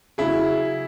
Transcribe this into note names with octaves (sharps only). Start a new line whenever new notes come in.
C#3 F#3 E4 G#4